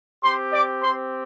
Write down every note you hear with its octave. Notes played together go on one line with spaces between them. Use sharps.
C4 G4 C5 C6
D5 D6
C4 G4 C5 C6